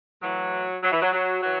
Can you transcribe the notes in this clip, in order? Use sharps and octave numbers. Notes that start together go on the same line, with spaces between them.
A2 E3 F#3
F#3
E3
F#3
F#3
E3 F#3